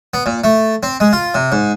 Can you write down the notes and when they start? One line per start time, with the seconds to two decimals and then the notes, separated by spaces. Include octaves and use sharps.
0.14 B3
0.26 A#2
0.44 A3
0.83 C4
1.00 G#3
1.13 F4
1.34 C3
1.52 G#2